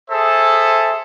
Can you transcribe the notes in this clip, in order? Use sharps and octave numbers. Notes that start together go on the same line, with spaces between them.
G#4 A4 C5 E5